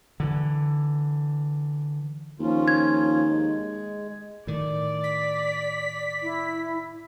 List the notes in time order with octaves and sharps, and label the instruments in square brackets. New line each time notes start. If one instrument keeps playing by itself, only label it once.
[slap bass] D3 E3
[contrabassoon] D#2 [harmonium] F3 C#4 F4
[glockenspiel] G#6
[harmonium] G#3
[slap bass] A2 D#3 [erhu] D5
[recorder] B6
[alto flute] E4